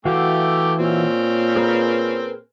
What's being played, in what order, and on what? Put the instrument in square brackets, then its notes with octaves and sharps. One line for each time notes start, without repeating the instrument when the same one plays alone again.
[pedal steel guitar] E3 F#4 F5 [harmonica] A3 G5 D6
[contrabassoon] A#2 [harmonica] C4 C#4
[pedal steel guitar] G#4 A#4 B4